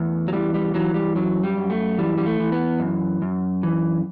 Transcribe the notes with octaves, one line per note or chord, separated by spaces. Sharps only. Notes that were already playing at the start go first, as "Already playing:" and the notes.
Already playing: E2 A3
F#3
E3 G3
G3
E3 F#3
G3
F#2 F#3
G3
F#2
A3
E3 G3
G3
A3
E3
B3
F#2
F#2
E3